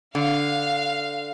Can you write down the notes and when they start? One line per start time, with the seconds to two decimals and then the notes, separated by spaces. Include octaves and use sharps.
0.15 D3 F5